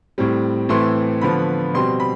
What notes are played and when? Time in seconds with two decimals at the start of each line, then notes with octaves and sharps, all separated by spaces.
0.18 A2 G3 C4
0.69 A2 E3 A3 C4 C6
1.21 D3 F3 B3 B5
1.74 B2 G3 C4 C6
2.00 B5